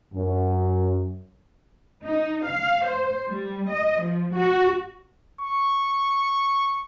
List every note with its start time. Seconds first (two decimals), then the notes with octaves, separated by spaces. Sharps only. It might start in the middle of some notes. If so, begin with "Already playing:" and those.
0.14 F#2
2.04 D#4
2.45 F5
2.87 C5
3.29 G3
3.72 D#5
4.03 F3
4.36 F#4
5.41 C#6